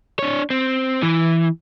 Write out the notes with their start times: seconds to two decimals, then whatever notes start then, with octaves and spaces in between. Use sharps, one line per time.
0.19 D4 C#5
0.50 C4
1.03 E3